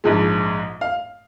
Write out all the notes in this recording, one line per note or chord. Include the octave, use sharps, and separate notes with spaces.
A#1 G#2 F3 G#3
F5